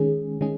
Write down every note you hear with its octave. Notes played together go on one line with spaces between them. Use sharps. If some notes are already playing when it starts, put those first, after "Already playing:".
Already playing: D#3 G#3 C#4 G#4
D#3 G#3 C#4 G#4